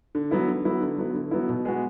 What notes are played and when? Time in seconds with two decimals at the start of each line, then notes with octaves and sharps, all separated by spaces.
0.15 D3
0.31 F#3 B3 E4
0.48 D3
0.65 F#3 B3 E4
0.81 D3
0.98 F#3 B3 E4
1.14 D3
1.31 F#3 B3 E4
1.49 B2
1.65 G#3 B3 F#4